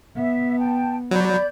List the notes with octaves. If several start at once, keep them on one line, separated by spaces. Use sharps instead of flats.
B3 E5
G5 A5
F#3 D5 B5 G6